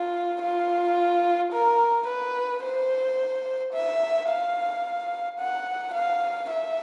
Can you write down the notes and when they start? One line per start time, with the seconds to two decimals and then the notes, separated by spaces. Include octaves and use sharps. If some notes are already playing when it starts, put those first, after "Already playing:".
Already playing: F4
0.42 F4
1.53 A#4
2.08 B4
2.63 C5
3.73 E5
4.29 F5
5.39 F#5
5.94 F5
6.50 E5